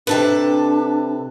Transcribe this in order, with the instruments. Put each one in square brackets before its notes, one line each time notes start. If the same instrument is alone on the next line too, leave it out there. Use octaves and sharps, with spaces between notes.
[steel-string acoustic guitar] C3 A4 B4 [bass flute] D4